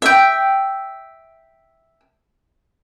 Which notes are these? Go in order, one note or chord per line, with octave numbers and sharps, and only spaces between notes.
E5 G5